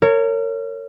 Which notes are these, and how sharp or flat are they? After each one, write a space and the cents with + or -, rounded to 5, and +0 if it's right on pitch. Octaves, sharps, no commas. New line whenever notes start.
A#4 -30 C#5 +0